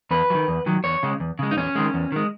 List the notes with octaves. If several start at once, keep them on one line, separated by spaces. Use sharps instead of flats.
E2 B4
F#3
D#3
E2
D#3 F#3
E2 C#5
C#3 G#3
E2
C#3 G#3
D#4
E2 C#4
D#3 G#3
E2
D#3 G#3